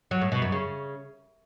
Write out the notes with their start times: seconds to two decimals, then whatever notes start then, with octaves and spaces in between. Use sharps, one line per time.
0.11 F#3
0.21 A2
0.32 B2
0.42 F#2
0.52 C#3